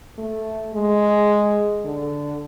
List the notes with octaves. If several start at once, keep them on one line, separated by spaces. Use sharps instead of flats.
A3
G#3
D3